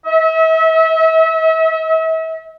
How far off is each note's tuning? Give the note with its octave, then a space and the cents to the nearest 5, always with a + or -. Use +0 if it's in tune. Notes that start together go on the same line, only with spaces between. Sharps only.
E5 -40